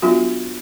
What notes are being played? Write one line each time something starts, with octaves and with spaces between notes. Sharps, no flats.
F#3 B3 D4 F4 F#4